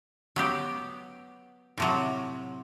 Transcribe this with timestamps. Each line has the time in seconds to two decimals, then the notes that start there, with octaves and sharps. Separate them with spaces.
0.36 F#3 B3 G4
1.78 A2 C3 F#3